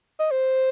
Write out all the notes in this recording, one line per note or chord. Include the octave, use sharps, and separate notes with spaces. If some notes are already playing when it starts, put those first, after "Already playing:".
D#5
C5